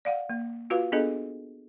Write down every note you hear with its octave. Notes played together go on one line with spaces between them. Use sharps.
D5 F5 F#5
A#3
F4 F#4 B4 F5
B3 D4 G#4 A4 D#5